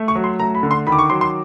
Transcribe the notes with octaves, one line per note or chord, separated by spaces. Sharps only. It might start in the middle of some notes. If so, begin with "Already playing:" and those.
Already playing: A3
C#6
F#3
C6
A3 A#5
B5
D3
C6
D#3 B5
D6
C#6
F#3 C6
C6